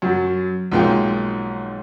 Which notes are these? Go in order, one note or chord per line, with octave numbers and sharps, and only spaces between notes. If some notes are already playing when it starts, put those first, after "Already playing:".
F#2 F#3
B1 G#2 F3 A#3 G5